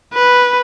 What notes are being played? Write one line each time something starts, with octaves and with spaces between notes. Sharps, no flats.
B4